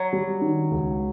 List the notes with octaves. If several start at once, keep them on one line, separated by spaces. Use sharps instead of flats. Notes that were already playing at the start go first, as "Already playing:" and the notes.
Already playing: F#3
G3
D#3
C#2